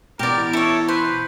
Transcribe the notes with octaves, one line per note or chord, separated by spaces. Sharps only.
B2 E3 G4 A#4 D5
E4 A4 C#5
B4 C5